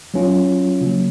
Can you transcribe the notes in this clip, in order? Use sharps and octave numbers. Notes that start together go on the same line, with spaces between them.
F#3 C#4 F4
C#3 F#3 A#3